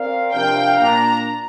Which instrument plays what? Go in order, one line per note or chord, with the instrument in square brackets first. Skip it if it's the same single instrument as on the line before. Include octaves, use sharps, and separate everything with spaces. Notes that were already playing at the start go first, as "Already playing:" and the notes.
Already playing: [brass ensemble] C4 A#4 D5 F5
[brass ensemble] C3 F3 D4 A#4 F5 [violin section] G5
[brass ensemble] A#2 A#3 D4 [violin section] A#5